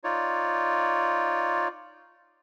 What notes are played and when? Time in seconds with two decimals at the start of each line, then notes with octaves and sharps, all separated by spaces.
0.04 D#4 F4 C#5 D5